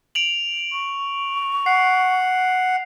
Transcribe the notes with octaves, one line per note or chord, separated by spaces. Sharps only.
D7 F7 F#7
C#6
F#5 C7